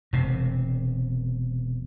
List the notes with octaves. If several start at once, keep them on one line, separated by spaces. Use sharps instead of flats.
E1 C3